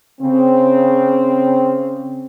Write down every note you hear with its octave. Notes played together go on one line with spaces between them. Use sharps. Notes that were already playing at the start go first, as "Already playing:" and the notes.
C#3 C4